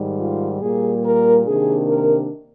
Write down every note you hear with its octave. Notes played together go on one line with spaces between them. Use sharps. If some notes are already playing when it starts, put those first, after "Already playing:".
Already playing: G#2 D#3 G3
F4
A#2 G3 A#3 G#4
A#4
C3 D#3 A#3 D4 G#4
A#4